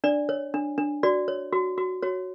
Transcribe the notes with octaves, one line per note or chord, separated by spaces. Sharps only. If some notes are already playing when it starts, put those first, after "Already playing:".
D4 D5
C#5
D4
D4
F#4 D5
C#5
F#4
F#4
F#4 C#5